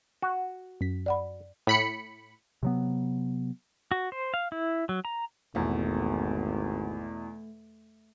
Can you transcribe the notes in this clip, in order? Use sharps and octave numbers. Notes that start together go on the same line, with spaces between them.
F#4
F#2 B6
D5 F#5 B5
A2 B5 C#7
C3 F#3 B3
F#4
C5
F5
E4
F#3
A#5
G#1 E2 B2 A3